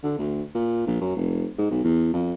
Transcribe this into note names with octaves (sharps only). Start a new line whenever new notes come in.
D3
D2
A#2
A#1
F#2
F1
G#2
B1
E2
F2